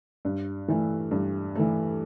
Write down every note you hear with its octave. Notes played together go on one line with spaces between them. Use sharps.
G2
E3 A3
G2
E3 A3